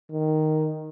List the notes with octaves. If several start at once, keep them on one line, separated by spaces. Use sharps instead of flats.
D#3